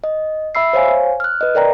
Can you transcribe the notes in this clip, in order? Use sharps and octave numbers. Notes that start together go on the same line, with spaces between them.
D#5
E5 B5 E6 C7
C5 C#5 F5 G#5
F6 F#6
B4 D#5
A#4 D5 G5 A#5